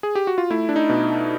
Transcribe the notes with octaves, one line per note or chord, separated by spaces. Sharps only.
G#4
G4
F#4
F4
A3 E4
D4
D#4
B2